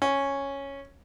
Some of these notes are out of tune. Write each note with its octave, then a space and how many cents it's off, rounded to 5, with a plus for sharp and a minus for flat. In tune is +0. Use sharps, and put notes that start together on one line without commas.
C#4 -5